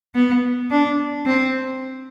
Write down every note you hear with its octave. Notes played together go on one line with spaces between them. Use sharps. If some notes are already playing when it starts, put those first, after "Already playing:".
B3
D4
C4